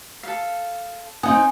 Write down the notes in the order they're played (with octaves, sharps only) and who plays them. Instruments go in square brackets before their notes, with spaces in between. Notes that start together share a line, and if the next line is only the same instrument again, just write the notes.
[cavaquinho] A4 F5
[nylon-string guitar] C4 D#4 F#5 [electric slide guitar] G#5 [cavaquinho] D#6